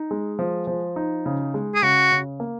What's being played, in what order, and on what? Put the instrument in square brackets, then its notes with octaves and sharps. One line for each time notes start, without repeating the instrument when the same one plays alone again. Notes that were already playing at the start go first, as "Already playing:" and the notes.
Already playing: [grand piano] D#4
G#3
F3
F3
D#4
C#3
G#3
[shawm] G#4
[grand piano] C#3 [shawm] F#4
[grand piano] C#3
A#3